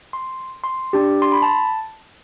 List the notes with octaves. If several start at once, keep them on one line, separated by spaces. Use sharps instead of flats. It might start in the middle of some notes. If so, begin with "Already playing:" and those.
C6
C6
D4 G4
C6
B5
A5